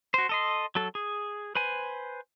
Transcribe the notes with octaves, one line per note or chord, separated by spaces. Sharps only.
F#4 C5
A4 D#5 C6
F#3 A4
G#4
B4 C5 G#5